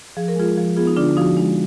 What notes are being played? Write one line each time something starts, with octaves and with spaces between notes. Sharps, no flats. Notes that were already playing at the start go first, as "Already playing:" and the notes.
F3 G#4
A#4
G#3 F4 G#4
F3
B3 F4 G#4
D#4
D3 D4 F4
F3 D#4 F#4
G#3 D#4